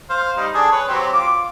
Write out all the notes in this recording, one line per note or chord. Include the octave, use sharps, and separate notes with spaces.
C5 F5
G3 D#4
D4 G#4 A4
B4 C#5
F#3 C4 G4
F4 D6